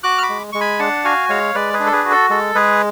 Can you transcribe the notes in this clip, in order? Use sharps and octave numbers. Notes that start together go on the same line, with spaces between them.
F#4 D6 F#6
F6
B5 D6
G#3
G#3 C#6
G#5 B5
D4 F#5 A5
F#4 F5 G#5
G#3 C#5 F5
G#3 B4 D5
G#4 B4
D4
A4
G#4 B4
F#4
A4
G#3 A4
G#3 G#4 B4